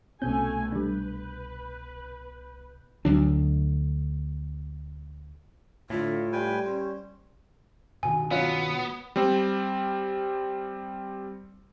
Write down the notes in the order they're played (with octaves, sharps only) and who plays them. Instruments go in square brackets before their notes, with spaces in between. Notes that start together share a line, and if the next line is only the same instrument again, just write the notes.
[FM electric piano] C2 B2 G6 [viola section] A3 G#5 [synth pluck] C4 C#4
[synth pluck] G3 D4 [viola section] B4
[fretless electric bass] D2 F#3 D4
[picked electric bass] A2 [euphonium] D3 [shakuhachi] F4
[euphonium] G3 [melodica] B4 G5 G#5
[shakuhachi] C#4 [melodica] C5
[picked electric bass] G2 B2 D#3 [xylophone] G#5
[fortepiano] F#3 C#4 F4 [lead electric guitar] B3
[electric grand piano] G3 C4